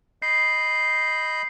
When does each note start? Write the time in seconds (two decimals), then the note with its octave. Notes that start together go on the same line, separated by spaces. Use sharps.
0.22 D#5 B5 G6 C7